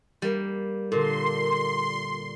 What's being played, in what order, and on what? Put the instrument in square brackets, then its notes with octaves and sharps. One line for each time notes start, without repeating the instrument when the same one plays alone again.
[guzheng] G3 A#3
[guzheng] A#2 [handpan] D3 A4 [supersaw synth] C6